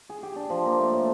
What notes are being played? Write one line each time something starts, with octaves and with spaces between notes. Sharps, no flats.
G#4
G4
D4
F3
A#3
A3
A2